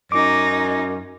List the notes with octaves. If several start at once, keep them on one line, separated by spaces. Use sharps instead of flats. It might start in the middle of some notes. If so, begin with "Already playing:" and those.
F#2 D#4 D6